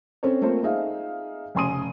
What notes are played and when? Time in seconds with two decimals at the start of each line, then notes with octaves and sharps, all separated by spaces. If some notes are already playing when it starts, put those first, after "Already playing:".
0.23 C4 C#4 A4 C5 C#5
0.42 A3 A#3 C4 F4 C5
0.63 D#4 G#4 E5 F5
1.55 F1 C#3 G#5 C6 D#6 D#7